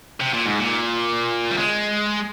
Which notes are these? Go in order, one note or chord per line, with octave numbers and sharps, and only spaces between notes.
C3
A#2
G#2
A#2
G3
G#3